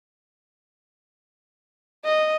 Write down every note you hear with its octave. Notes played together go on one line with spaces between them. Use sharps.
D#5